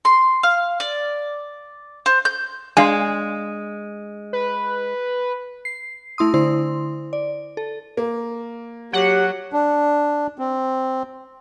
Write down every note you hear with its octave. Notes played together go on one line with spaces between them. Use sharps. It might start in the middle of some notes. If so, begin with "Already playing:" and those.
C6
F5
D5
C5
G6
G#3 D4 D5 F5 G#5 C6
B4
C7
A3 E4 C6 D#6
D3 E4 C5 C6
D5
A4
A#3
F#3 G4 F#5
D4
C4